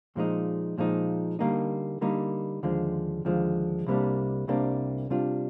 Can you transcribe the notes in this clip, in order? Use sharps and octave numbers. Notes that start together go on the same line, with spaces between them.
A#2 F3 G#3 D#4
A#2 F3 G#3 D#4
D3 G3 A#3 D#4
D3 G3 A#3 D#4
D#2 D3 F3 G#3
D#2 D3 F3 G#3
C2 C3 G3 A#3 D4
C2 C3 G3 A#3 D4
C3 G3 D4 F4